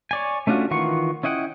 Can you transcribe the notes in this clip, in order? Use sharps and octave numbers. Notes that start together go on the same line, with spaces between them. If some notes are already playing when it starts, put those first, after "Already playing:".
C#5 D5 G#5
A3 C#4 D4 F4 F#4
D#3 E3 F4 F#5 C#6
C#4 E4 D#5 F#5 G5